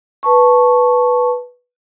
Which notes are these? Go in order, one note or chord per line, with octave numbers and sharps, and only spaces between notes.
B4 A5 C#6